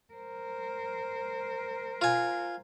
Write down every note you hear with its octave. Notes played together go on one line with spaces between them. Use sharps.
A#4 C5
F4 G#5